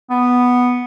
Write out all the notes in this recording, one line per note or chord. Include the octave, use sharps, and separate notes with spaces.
B3